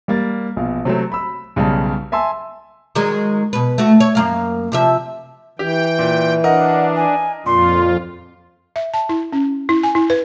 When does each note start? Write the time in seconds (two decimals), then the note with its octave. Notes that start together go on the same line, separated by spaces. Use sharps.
0.08 G3 A#3 A6
0.56 A#1 B2 F5
0.85 C3 F#3 A3 C4
1.12 B5 E6
1.56 B1 C#3 G3 A5
2.12 E5 G#5 A5 C6 E6
2.95 D#3 F#3 G#3
3.53 B2 B4
3.78 A3 F#4
4.00 C#5
4.15 F#2 A#3 F5
4.72 C3 F3 E5
5.59 E3 G4 G5
5.99 A#2
6.44 D4 A#4 D#5 F#5
6.96 G#5
7.46 F2 A#2 F4 C6
8.76 E5
8.94 A5
9.09 E4
9.33 C#4
9.69 E4
9.83 G#5
9.95 E4
10.10 B4